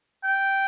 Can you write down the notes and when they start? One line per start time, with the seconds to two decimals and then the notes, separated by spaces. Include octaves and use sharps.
0.24 G5